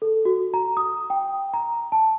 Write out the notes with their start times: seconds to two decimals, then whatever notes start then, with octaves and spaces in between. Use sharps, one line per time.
0.02 A4
0.25 F#4
0.54 A#5
0.77 D#6
1.10 G5
1.54 A#5
1.92 A5